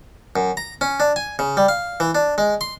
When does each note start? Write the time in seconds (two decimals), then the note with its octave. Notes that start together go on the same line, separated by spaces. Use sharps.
0.36 F#2
0.57 A#5
0.81 C#4
1.00 D4
1.16 G#5
1.39 C#3
1.57 G3
1.69 F5
2.00 E3
2.15 D4
2.38 G#3
2.61 C6